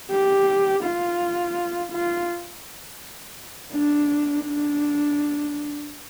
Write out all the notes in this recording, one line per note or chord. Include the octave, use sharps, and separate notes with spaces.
G4
F4
F4
D4
D4